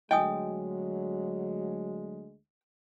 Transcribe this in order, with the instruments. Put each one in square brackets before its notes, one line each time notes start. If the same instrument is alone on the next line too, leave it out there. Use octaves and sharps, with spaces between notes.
[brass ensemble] D2 G#3 [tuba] F#3 [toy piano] D#5 G#5 D#6 [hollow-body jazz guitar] G5